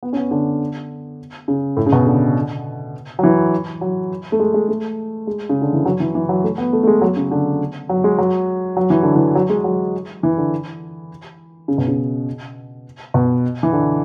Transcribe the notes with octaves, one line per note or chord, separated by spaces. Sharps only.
B3
C#4
B3
D3
C#3
A2
C#3
B2
D3
F#3
E3
F#3
A3
G#3
G#3
A3
G#3
C#3
D3
E3
F#3
E3
E3
F#3
A3
B3
A3
A3
G#3
F#3
C#3
D3
F#3
G#3
F#3
F#3
E3
D3
E3
F#3
G#3
F#3
E3
D3
C#3
B2
C#3
B2
E3
D3